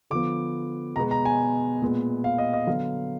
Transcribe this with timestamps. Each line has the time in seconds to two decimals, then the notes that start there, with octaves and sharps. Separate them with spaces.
0.10 D3 F3 B3 D6
0.96 B2 G#3 B3 A#5
1.11 A#5
1.25 G#5
1.82 A#2 G#3 B3
2.24 F5
2.38 D#5
2.54 D#5
2.67 D3 F#3 B3 F5